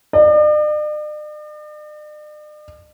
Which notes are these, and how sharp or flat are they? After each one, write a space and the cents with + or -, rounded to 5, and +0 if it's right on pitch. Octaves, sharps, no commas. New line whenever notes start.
D5 +45